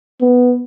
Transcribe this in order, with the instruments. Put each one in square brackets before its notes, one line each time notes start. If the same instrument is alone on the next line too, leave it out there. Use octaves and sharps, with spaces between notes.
[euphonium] B3